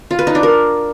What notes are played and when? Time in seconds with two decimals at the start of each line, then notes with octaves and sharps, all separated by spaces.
0.11 F4
0.19 B4
0.27 D#4
0.35 D4
0.43 A#4